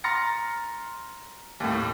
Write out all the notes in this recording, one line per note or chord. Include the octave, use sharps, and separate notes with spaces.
A#5 C6 F6 A6 A#6 C#7
D#2 A2